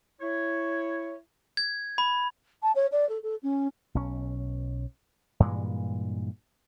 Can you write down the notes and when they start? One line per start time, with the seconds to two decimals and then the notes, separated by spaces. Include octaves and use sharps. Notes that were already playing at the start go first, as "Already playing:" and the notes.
0.21 E4 C#5
1.57 G#6
1.98 B5
2.62 A5
2.75 C#5
2.92 D5
3.09 A4
3.23 A4
3.43 C#4
3.95 B1 C#4
5.40 G2 A#2 E3 G#3